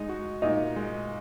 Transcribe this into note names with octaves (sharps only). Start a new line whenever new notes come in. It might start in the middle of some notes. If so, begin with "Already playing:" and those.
Already playing: G#3 D#4
F#4
A#2 D#4
G#3